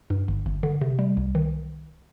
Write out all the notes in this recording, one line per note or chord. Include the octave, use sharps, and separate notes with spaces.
G2
G1
G1
D3
C3
G3
C2
D#3